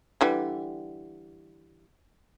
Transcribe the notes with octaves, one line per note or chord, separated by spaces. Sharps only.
D3 E3 G3